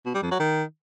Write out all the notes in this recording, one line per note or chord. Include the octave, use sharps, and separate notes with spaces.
B2
G3
F2
F#3
D#3